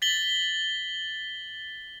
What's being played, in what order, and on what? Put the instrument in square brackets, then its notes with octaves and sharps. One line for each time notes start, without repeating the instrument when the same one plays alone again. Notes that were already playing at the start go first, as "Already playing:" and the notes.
[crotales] A6 B6 F#7 G7